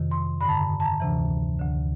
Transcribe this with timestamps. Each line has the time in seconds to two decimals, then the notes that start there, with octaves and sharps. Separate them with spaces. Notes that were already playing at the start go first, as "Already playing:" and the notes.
Already playing: F2 C3 D#3
0.11 C6
0.41 G2 D3 B5
0.48 A5
0.55 A#5
0.80 A5
0.85 A#5
1.00 D2 C3 E3
1.59 D2 D3